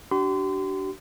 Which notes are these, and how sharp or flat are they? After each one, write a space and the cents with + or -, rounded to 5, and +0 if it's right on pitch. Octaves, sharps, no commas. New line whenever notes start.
D4 +0 G4 -45 C6 -35